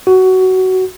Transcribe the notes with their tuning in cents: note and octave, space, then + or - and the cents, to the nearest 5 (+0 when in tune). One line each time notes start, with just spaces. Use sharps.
F#4 +15